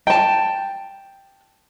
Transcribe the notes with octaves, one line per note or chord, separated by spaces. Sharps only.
G5 A5